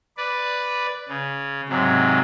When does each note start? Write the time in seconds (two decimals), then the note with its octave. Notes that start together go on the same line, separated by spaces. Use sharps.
0.17 B4 D5
1.08 C#3
1.69 G#2 C3 F#3